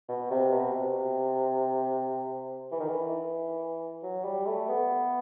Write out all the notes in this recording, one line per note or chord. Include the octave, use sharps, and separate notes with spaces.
B2
C3
B2
C3
E3
D#3
E3
F#3
G3
A3
B3